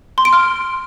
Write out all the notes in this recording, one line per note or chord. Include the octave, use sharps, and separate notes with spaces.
C6
D7
F6